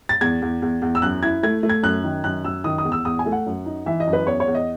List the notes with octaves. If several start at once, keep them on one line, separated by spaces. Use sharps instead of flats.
A6
E2 G#6
E2
E2
E2
E6
F#2 F#6
E4 G#6
A3 G#6
A3
G#6
F#2 F#6
D#3
F#2 F#6
F#2 E6
D#3 D#6
D#6
E2
E6
E2 D#6
G#5
A3
F#5
F#2
D#4
E3 E5
D#5
F#2
B4
E2 C#5
C#5
E2
D#5